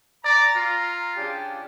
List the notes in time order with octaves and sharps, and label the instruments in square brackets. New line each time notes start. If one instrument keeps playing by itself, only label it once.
[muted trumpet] D5 [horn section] A#5
[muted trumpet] F4
[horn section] C#3 D4 G4